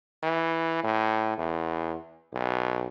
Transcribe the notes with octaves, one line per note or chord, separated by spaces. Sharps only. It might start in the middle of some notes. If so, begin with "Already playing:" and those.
E3
A2
E2
B1